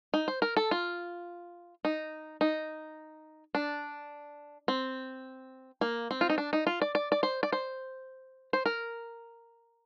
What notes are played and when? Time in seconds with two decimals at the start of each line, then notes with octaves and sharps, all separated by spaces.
0.14 D#4
0.28 C5
0.42 A#4
0.57 A4
0.71 F4
1.85 D#4
2.41 D#4
3.55 D4
4.68 C4
5.81 A#3
6.11 C4
6.21 F4
6.30 D#4
6.38 D4
6.53 D#4
6.67 F4
6.82 D5
6.95 D5
7.12 D5
7.23 C5
7.43 D5
7.52 C5
8.53 C5
8.66 A#4